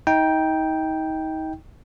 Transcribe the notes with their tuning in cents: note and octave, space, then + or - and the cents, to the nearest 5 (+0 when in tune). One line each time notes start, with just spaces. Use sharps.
D#4 +30 G5 +0